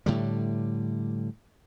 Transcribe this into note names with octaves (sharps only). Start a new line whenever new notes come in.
A2 D3 G3